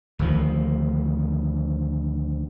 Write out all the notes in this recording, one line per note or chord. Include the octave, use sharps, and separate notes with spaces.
D2 D#3 F3